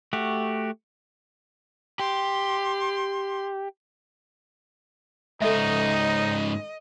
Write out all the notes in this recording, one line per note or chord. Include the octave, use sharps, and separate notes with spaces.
A3 F#4 G4
G4 C6
G#2 C#3 D#4 A4 D#5 E5